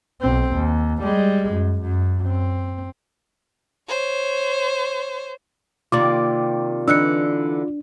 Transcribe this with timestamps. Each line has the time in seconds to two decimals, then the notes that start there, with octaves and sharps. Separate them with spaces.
0.21 B1 C4
0.53 D#2
1.03 G3 G#3
1.51 F#2
1.82 F#2
2.27 C4
3.88 C5 C#5
5.92 C3 D#3 A#3 F4 D5 D6
6.88 D3 E3 D4 D#4 E6 F#6 C#7